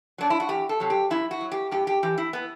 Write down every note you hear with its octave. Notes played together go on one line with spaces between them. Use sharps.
F#3 D4
E4
F#4
E2 G4
A4
C3 F#3
G4
F#2 E4
F#4
F#3
G4
G2 G4
G4
E3 G4
E4
B3